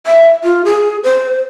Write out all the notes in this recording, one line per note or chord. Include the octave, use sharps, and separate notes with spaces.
E5
F4
G#4
C5